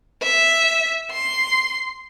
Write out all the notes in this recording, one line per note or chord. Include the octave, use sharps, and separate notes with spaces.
E5
C6